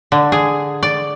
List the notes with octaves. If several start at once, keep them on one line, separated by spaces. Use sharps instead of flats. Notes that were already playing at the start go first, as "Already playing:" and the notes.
D3
G#4
D5